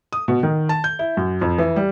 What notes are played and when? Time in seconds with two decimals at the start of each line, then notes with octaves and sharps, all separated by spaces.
0.13 D#6
0.28 B2
0.43 D#3
0.69 A5
0.84 G6
0.99 E4
1.17 F#2
1.41 F2
1.58 E3
1.76 G3